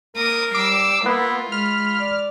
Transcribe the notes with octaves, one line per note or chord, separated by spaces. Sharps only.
A#3 A#4 D6 D#6
G3 D6 E6 C7
A#3 B3 E4 F4
G#3 B5 F6
D5